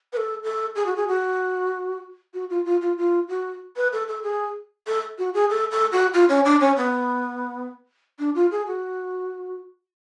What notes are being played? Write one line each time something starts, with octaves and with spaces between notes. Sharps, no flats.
B4
A4
A4
G#4
F#4
G#4
F#4
F#4
F4
F4
F4
F4
F#4
B4
A4
A4
G#4
A4
F#4
G#4
A4
A4
F#4
F4
C#4
D4
C#4
B3
D4
F4
G#4
F#4